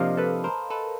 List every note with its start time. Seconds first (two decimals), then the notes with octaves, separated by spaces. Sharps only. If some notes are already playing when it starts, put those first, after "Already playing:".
Already playing: C3 F3 A#3 D4 D#5 F5
0.17 A4 B4
0.44 A#4 C5
0.70 A4 B4